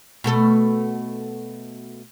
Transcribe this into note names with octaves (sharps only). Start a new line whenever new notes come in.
B2 A3 A4